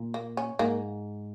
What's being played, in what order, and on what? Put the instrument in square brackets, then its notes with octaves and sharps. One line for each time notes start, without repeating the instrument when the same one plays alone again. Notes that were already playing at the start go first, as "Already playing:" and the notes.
Already playing: [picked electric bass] A#2
[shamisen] A#3
C#4
[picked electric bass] G#2 [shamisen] A#3